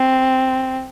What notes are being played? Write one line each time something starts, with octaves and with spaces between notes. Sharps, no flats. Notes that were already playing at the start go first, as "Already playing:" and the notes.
Already playing: C4